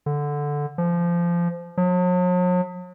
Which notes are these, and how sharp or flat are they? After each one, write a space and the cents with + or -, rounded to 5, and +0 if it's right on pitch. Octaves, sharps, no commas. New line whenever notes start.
D3 -5
F3 -20
F#3 -45